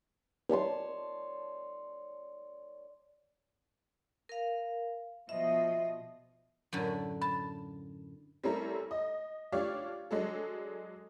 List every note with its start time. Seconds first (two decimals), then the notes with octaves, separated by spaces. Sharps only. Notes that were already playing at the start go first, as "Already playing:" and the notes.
0.49 C#5 D5 A5 C6
4.29 A#4 F5
5.29 B2 F3 D#5 E5
6.73 F#2 A2 D3
7.21 A5 B5
8.43 G3 C4 C#4 E4 A4 A#4
8.91 D#5
9.52 F3 D4 G4 C#5 D5 F5
10.11 F#3 G#3 D4 A4